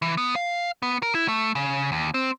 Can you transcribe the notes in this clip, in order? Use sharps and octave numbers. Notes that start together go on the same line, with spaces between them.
E3
B3
F5
B3
A#4
E4
A3
C#3
D#2
C4